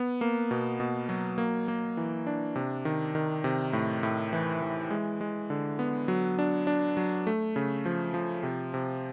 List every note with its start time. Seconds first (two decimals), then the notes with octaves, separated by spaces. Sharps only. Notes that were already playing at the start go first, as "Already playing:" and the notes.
Already playing: B3
0.21 A#3
0.51 B2
0.80 B2
1.09 F#3
1.38 A#3
1.68 A#3
1.97 E3
2.27 D4
2.56 C3
2.85 D#3
3.15 D#3
3.44 C3
3.73 A2
4.03 A2
4.33 E3
4.62 E3
4.90 G#3
5.21 G#3
5.50 D3
5.79 B3
6.08 F#3
6.39 D4
6.67 D4
6.97 F#3
7.27 A3
7.56 C#3
7.85 F3
8.14 F3
8.43 C3
8.74 C3